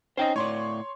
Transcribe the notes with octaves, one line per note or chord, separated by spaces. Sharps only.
C#4 D#4 C5 D#5 G5
A2 C#5 D5 C6 C#6